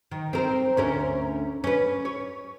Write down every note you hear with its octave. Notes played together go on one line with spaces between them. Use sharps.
D#3
C4 A#4
D2 C#4 A#4
C#4 B4
C#5